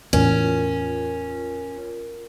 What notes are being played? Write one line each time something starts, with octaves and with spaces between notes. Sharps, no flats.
E2 A2 E3 C#4 F4 A#4